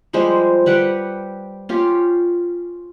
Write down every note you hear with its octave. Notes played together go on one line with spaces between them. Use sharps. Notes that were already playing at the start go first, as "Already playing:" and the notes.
F3 G3 G#3 C5
G3 B4 F#5 G5
C#4 F4 G4